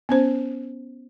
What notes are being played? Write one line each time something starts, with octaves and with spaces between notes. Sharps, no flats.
B3 C#4 C5